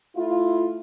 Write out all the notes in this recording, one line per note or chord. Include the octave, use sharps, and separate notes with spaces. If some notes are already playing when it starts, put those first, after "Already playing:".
A3 E4 F4